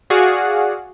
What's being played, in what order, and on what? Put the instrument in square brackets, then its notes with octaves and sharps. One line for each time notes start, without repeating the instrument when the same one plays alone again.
[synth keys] F#4 G#4 D5 F5 F#5